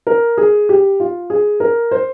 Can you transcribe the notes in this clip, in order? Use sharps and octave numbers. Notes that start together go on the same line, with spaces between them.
A#4
G#4
G4
F4
G#4
A#4
C5